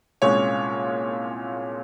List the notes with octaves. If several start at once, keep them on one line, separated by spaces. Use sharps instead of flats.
C2 A#2 G#3 C#4 C#5